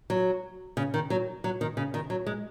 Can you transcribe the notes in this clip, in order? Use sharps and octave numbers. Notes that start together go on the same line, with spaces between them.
F#3
C#3
D#3
F#3
F#3
D#3
C#3
D#3
F#3
G#3